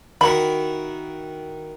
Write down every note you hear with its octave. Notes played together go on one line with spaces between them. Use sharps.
D#3 E4 F#4 B5